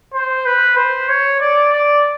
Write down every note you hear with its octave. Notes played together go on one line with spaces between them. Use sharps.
C5
B4
C5
C#5
D5
D5